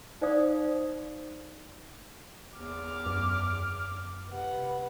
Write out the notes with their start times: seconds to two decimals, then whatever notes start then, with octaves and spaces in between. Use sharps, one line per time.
0.21 D#4 C5 D5 F5 D#6
2.58 E2 D6 F6
3.06 F#2
4.31 C3 B3 F#5